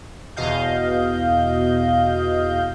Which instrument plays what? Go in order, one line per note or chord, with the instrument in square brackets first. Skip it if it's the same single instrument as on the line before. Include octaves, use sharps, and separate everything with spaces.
[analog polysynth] E2 B2 D#5 F5 G6